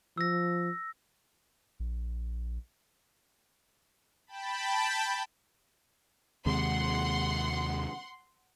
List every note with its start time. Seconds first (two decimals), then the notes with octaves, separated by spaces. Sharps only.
0.17 F3 E6 A#6
1.80 A#1
4.27 G5 A5 B5
6.46 D#2 C3 G#3 F#5 C6